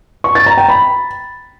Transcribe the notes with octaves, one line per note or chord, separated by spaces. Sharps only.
C#6
A6
A#5
G5
B5